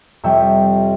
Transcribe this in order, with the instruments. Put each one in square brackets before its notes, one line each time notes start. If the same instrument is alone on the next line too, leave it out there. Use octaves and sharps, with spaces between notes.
[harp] F2 C3 G3 C#5 E5 G5